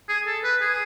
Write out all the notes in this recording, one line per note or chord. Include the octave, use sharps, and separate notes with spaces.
G#4
A4
B4
G#4